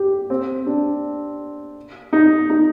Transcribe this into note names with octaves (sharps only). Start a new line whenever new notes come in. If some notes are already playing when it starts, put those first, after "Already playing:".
Already playing: G4
C4
D4
D#4
D#4